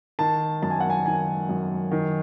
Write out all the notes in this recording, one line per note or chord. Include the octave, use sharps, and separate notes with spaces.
D#3 A5
F#2 A5
G#5
F#5
G#5
D#3 G#5
F#2
D#3